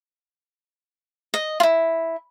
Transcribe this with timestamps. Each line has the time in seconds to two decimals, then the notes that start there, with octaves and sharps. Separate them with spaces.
1.34 D#5
1.60 E4 F4